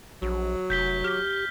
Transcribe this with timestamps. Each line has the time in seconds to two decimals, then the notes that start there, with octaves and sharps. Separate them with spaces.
0.22 A#1 F#3
0.70 F1 G6 B6 G7
1.04 G4 F6